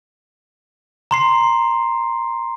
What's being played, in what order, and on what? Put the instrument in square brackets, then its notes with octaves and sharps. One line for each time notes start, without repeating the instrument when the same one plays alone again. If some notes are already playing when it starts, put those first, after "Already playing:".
[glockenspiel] A#5 C6 C7